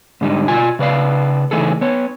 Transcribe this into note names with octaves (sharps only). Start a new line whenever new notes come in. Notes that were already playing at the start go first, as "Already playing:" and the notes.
G#2 D3 G3 D#4
B2 F4 G#5
C#3 B4 D5 F5
C#3 E3 A3 D#4 G#4 A4
B3 C#5